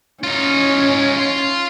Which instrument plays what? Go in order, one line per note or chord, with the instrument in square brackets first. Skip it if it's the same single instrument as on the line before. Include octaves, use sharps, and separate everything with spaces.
[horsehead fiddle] C#4 [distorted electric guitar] D#4 F4
[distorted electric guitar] F5 C6